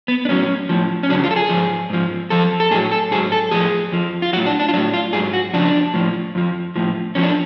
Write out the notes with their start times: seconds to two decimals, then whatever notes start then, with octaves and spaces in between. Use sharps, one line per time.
0.08 B3
0.25 D4
0.29 A2 F#3 C#4
0.69 A2 F3
1.03 C#4
1.09 F2 C#3 F#3 D4
1.24 F4
1.31 A4
1.36 G#4
1.50 G#2 F3
1.90 G#2 F3
2.30 F2 F3 A4
2.60 A4
2.71 A2 G#4
2.75 F#3
2.92 A4
3.11 G#2 F#3 G#4
3.32 A4
3.51 A2 F3 G#4
3.92 F2 F3
4.22 F4
4.33 F#3 F#4
4.37 A2
4.46 D4
4.60 D4
4.69 F4
4.73 F#3 D4
4.77 A2
4.94 F4
5.13 G#2 F#3 G#4
5.33 F#4
5.53 F2 C#3 F3 D4
5.94 A2 F3
6.35 F2 F3
6.76 A2 F3
7.15 F2 F3 C#4
7.23 D4